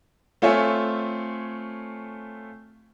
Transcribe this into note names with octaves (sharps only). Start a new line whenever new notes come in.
A3 C4 F4 C#5 E5 G#5